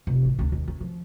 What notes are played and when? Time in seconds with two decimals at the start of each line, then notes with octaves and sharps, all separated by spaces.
0.07 F1
0.25 A1 D4
0.39 D2 D4
0.52 D#2
0.68 C#4
0.81 F3